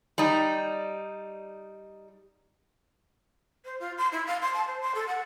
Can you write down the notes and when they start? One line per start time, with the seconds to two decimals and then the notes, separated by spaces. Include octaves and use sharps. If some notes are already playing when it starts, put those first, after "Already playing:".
0.18 G3 D#4
3.65 C5
3.80 F4
3.98 C6
4.12 E4
4.27 F5
4.42 C6
4.54 A5
4.67 C5
4.81 C6
4.95 A4
5.07 F#5